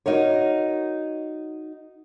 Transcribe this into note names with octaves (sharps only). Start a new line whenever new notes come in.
D#4 F#4 A#4 C#5